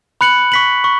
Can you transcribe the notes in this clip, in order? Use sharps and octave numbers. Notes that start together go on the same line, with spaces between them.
B5 F#6 C#7 F#7
C#6 B6 F#7
C#6